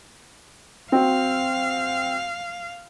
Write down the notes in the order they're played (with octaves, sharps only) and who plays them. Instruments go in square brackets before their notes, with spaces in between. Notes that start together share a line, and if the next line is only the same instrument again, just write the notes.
[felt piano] C4 F#4 [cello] F5